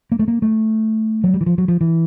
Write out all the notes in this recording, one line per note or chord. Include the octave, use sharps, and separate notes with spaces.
A#3
A3
A#3
A3
F#3
G3
E3
F3
F#3
F3
E3